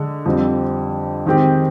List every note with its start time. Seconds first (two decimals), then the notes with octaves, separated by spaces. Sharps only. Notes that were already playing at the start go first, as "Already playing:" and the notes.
Already playing: D3 G#3
0.25 F2 D3 G3 C4
1.26 D#3 G#3 C4 G4